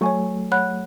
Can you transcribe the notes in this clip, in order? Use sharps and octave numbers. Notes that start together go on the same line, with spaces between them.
F#3 A3 C#5 G#5 C#6
C#5 F#5 B5 F#6